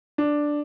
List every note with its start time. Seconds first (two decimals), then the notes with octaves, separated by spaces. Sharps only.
0.18 D4